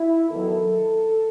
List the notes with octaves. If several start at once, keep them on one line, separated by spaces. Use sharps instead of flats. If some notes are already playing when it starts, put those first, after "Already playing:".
Already playing: E4
E2 D#3 F#3 A4